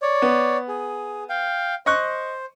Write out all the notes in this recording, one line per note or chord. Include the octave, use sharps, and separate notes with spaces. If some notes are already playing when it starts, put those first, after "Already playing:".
C#5 D5
B3
G#4
F5 G5
C5 D#5 C#6 F#6